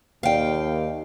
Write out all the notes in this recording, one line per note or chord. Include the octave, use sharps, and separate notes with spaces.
D#2 F5 G5